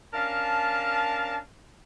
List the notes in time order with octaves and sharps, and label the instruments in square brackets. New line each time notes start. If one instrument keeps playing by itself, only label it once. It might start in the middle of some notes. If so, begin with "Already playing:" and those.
[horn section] C#4 D4 A#4 F5 A5